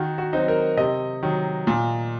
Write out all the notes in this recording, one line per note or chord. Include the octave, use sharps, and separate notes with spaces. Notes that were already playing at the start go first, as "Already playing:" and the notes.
Already playing: D#3 F#4
F#4
F#3 C4 D#4
A#4
C3 D#5
D#3 F#3
A#2